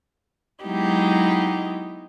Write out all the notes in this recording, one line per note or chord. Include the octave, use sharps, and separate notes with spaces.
F#3 G#3 B3 D#4 E4 G4